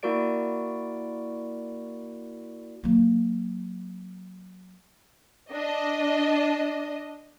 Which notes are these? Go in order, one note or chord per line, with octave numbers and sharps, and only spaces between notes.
A#3 E4 F#4 A#4 D5 D7
F#3 A#3
D4 D#5